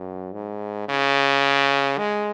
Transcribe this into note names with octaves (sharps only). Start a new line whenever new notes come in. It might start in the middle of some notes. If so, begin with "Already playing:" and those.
Already playing: F#2
G#2
C#3
G#3